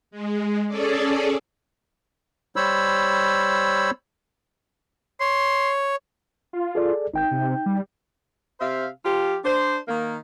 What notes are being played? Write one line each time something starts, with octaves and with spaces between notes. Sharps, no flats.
G#3
C#4 G#4 A4 D5
G3 C5 C#5 B5 E6
C#5 C6
F4
G#4 A4 D5
G#1 D#4 G5 G6
C3
G3
C3 C5 E5 F5
F3 F4 G4
D4 C5
D#3 A#3